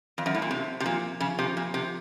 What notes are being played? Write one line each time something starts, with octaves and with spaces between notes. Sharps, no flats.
F2
F#2
A2
A#2
C3 C4
C3
A#2 F3
C#3 F3
C3
A#2 F3
C3